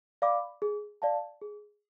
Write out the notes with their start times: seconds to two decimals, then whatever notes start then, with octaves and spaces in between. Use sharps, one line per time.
0.22 D5 F5 B5 D6
0.62 G#4
1.02 D5 F5 A5
1.41 G#4